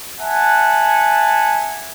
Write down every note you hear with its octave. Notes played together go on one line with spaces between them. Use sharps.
E5 F#5 G#5 A5